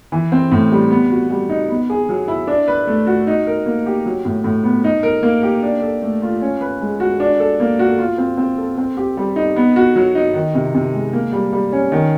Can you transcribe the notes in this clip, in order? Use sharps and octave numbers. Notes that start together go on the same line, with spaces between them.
E3
C4
A2
G3
B3
F#4
G3
D#4
B3
G#4
F#3
E4
D4
B4
A3
F#4
D#4
A#4
A#3
G4
F#3
A2
A2
B3
D#4
A#4
A#3
G4
D4
A4
A3
F4
C#4
B4
G#3
F#4
D4
A4
A#3
F#4
F4
C4
C4
A4
C4
G4
G3
D#4
B3
F#4
F#3
D#4
D#3
C3
C3
G#3
A#3
G3
G3
C#4
D#3